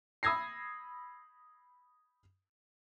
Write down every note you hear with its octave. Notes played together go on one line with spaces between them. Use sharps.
B5 D#6 E6 G#6 A#6 C7